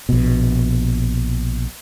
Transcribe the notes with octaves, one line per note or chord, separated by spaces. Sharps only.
A#1 B2